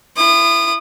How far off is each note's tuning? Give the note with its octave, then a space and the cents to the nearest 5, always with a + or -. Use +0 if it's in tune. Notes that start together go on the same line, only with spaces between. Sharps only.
E4 +25 D#6 -30